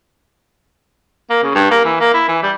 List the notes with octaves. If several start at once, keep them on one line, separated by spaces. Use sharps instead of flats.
A#3
C#3
G2
A#3
E3
A#3
E4
E3
G3